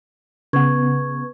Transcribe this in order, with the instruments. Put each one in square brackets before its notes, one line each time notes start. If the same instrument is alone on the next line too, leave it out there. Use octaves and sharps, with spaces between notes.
[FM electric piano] C#3 B3 [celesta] B4 C#6 G#6